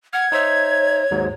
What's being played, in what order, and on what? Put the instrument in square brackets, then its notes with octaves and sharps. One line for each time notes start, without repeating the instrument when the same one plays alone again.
[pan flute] F#5 [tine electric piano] F6 [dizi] G#6
[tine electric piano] D#4 C5 E5 [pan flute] C#5
[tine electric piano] D#2 G#2 F#3